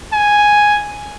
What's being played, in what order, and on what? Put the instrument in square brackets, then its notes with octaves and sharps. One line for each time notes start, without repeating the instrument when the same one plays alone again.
[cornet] G#5